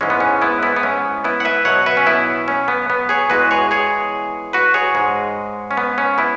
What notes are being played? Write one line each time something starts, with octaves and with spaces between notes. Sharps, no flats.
G#2 E3 G#3 C#4
B3
C#4
B3 E4
B3 E4
B3
C#4
B3 E4
F#5
B4 E5
B2 F#3 C#5 F#5
B4 E5
C#4
B3 E4
C#4
B3
B3
G#4 C#5
E2 E3 G#3 F#4 B4
G#4 C#5
G#4 C#5
F#4 B4
G#4 C#5
G#2 G#3
C#4
B3
C#4
B3 E4